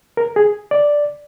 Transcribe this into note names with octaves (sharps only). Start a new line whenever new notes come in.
A#4
G#4
D5